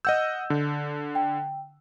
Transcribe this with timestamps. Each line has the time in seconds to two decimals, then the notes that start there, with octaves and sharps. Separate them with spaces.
0.05 D#5 F#5 E6 G6
0.50 D3
1.15 G5